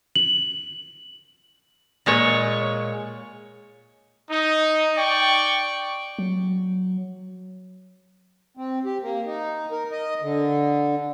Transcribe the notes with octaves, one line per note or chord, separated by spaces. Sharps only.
F#7
A#2 G#3 C#5
D#4
D5 G5 C#6
F#3
C4
G4
A#3
D#4
A#4
D#5
D3